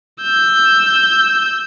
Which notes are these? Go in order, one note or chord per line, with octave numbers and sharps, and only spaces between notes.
E6 G6